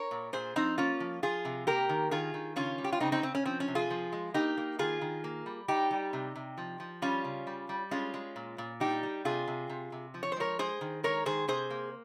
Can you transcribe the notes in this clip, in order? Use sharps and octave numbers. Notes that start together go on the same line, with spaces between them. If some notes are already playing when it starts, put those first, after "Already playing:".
Already playing: A#4 C#5
A#2
A#2 G#4 C5
F3 C4 D#4
A#3 C#4 F4
F3
F3 F4 G#4
C3
A#3 G4 A#4
D#3
D#3 F4 G#4
D#3
C#3 C#4 F4
G3
G4
F4
C#3 C4 D#4
C4 D#4
C#3 C4
C#4
F3 C4
C#4
C3
F4 G#4
F3
G#3
A#3 D#4 G4
A#3
D#3 F4 G#4
D#3
A#3
G3
G3 D#4 G4
G3
C3
C3
F3
F3
G3 C#4 F4
C#3
G3
G3
G#3 C#4 F4
G#3
A#2
A#2
G3 D#4 G4
G3
C3 F4 G#4
C3
C3
C3
F3
C#5
C5
G#3 A#4 C#5
G#3 G#4 C5
D#3
G#3 A#4 C#5
D#3 G#4 C5
C3 G#4 C5
A#3